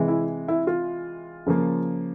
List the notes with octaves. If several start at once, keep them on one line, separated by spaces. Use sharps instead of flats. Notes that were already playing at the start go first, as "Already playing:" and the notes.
Already playing: C3 E3 G#3
E4
E4
F4
C#3 F3 A#3